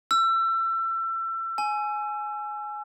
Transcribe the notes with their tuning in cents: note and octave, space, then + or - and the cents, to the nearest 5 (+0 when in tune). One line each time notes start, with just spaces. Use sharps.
E6 +30
G#5 +15